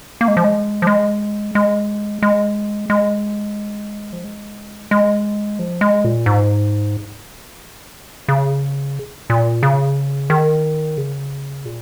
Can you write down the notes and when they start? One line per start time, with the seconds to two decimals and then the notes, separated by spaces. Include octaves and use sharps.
0.21 A#3
0.28 G#3
0.37 F3
0.44 G#3
0.82 F3
0.87 G#3
1.55 G#3
2.22 G#3
2.90 G#3
4.13 F3
4.24 G#3
4.91 G#3
5.59 F3
5.81 G#3
6.05 A#2
6.26 G#2
8.28 C#3
9.30 A#2
9.63 C#3
10.30 D#3
10.98 C#3
11.65 A#2